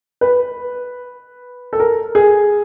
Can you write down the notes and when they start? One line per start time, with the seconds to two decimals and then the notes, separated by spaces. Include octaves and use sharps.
0.21 B4
1.73 A4
1.80 A#4
2.15 G#4